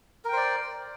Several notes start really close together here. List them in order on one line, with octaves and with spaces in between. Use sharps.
A#4 G5 C5 D5